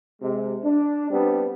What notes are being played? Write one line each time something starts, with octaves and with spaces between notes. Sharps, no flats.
C3 G#3
D4
G3 B3 C4 D4